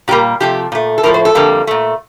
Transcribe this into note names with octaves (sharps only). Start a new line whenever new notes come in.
A#2 G3 A#3 G4
C3 F3 A3 G4
A#2 A3
A4
A2 F3 A3 A#4
C5
A4
F2 D3 G3 A#3
A#2 A3